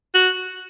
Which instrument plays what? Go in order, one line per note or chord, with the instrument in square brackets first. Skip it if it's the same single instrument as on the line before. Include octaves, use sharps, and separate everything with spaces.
[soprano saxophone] F#4